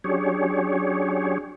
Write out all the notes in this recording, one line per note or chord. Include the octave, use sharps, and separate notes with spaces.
F#3 C#4 D4 G4 G#4 C#5